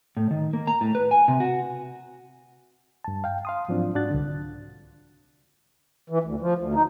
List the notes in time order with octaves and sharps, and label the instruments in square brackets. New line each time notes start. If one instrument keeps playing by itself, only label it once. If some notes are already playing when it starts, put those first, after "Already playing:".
[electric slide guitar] A2
D#3
A#3
A#5
A2
B4
G#5
C3
F#4
[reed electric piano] G2 A5
F5 G5
F5 C6 D#6
G#2 F3 F#3 C4 D4 F4
G#2 D4 F#4 F#6 A6
C2 D3
[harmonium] E3
D2
F3
D2
D#4